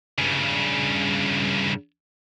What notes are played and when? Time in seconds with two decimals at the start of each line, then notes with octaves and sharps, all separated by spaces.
0.18 G2 C#3